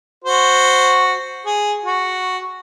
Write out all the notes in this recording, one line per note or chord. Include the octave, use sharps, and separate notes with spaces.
F#4 C5
G#4
F#4